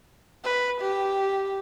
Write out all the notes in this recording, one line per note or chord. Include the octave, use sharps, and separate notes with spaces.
B4
G4